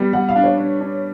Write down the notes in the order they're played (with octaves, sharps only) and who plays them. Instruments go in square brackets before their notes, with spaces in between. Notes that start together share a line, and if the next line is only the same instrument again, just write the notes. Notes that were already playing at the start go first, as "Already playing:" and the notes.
Already playing: [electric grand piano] G3 B3
[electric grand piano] G3 [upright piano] F#5
[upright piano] F5
[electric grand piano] D4
[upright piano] C#5
[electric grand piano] D4
D4